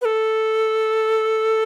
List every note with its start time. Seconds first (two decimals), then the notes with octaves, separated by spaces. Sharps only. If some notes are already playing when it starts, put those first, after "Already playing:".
0.02 B4
0.05 A4